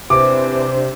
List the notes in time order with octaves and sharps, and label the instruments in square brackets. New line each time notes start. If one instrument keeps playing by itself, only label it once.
[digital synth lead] C3 [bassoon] E3 [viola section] D4 C5 [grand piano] D6